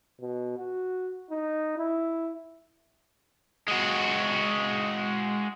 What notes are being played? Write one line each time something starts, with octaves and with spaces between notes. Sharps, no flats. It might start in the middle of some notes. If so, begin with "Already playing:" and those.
B2
F#4
D#4
E4
G#3 F#4